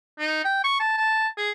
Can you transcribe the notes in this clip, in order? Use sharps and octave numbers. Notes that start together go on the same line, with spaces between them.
D#4
G5
C#6
A5
A5
G#4